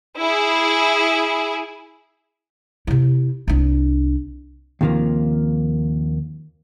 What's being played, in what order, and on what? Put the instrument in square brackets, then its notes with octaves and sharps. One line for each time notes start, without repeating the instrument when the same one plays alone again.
[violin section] E4 G#4
[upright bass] C3 E4
C2 D4
[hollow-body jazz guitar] D#2 C3 D#3 F3 A#3